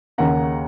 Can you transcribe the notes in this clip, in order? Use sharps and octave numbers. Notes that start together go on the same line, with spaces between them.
D#2 C#3 A#3 C#4 F#5 A#5